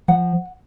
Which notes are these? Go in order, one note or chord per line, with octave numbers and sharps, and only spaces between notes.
F3 F#5